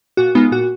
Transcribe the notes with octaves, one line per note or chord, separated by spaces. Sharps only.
A#2 F#4
G#3 B3 D#4 F4
A#2 F#4